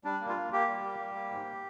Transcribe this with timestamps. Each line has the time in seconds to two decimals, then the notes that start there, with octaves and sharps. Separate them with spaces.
0.04 G3 D4
0.21 A#3
0.29 F4
0.36 A#3
0.52 A#3 G4
0.67 G3
0.84 A#3
0.99 G3
1.15 A#3
1.31 G#2